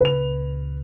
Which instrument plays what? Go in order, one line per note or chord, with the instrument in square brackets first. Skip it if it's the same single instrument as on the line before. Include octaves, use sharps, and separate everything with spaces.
[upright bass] C#2 A#2 [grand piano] B4 F7